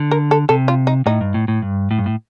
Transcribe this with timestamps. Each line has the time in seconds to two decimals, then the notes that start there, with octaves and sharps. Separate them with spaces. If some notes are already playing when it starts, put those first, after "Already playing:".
Already playing: D3
0.11 A#4
0.31 A4
0.49 C3 A4
0.68 F4
0.87 D#4
1.06 A2 D#4
1.21 G2
1.34 A2
1.48 A2
1.62 G2
1.91 A2
1.99 G2
2.06 A2